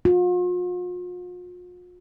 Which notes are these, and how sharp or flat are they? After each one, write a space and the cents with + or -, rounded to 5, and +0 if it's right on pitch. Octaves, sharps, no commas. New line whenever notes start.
F4 +45